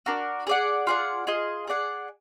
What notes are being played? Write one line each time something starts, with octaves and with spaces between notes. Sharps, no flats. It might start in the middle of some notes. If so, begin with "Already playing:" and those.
D4 F#4 A#4
G#4 D5 F#5
F4 G#4 D5 F#5
F4 G#4 D#5
G#4 D5 F#5